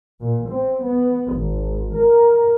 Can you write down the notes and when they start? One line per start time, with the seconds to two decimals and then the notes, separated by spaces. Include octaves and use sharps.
0.20 A#2
0.49 C4
0.83 B3
1.32 G#1
1.95 A#4